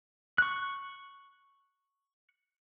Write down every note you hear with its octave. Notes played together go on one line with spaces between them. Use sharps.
C#6 F#6